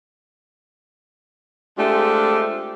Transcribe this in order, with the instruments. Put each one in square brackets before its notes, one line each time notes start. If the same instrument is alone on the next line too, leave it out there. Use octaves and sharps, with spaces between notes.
[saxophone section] G#3 A3 C4 D4 F4 G4